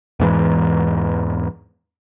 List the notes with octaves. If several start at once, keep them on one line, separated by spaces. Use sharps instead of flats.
E2 G#2 E3